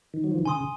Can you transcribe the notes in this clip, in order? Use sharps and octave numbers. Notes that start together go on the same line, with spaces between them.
D#3
F#3
F3
D#3
C#3 G#5 C6 D#6